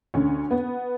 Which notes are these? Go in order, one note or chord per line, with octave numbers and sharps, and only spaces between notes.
D2 D3 C#4
B3